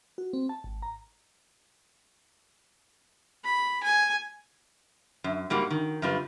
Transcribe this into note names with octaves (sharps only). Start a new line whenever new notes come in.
F#4
C4
A5
G#1
A#5
B5
G#5
F#2
G#2 G3 A#3 F#4
D#3
F#2 C#3 G3 F4 B4